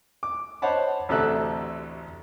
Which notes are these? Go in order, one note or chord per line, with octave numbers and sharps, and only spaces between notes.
D6
C5 C#5 D#5 F#5 A5 B5
A1 D2 C3 A4 E5 F#6